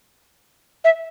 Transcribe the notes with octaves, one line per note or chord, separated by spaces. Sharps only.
E5